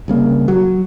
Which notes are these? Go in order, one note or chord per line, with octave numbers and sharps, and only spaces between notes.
C2 C#3 A#3
F#3